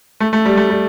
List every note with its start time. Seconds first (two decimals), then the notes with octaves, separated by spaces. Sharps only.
0.20 A3
0.33 A3
0.45 G3
0.57 A3
0.70 G3